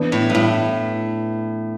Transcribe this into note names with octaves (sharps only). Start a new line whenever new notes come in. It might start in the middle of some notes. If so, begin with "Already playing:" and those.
Already playing: E3 B3 D4
A2
G2
A2